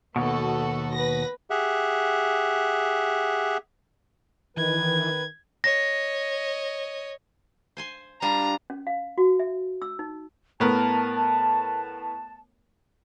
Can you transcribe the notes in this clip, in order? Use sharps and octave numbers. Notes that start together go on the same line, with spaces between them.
D#2 B2 B3 F#4 A4
B4 A#6
G4 G#4 E5 F#5
D#3 E3 B4 G#6
C#5 D#5 A#6
C5 G#5 C6
G3 D4 F4 A#5
C#4
F5
F#4
E5
E6
D#4
A2 B3 A#4 A5